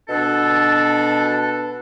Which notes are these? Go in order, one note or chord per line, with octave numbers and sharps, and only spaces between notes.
B2 D4 A4